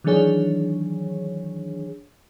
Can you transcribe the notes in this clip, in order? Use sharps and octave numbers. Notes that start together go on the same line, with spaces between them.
D#3 E3 F#3 D4 G#4 C#5